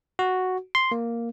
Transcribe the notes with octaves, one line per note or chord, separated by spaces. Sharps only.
F#4
C6
A#3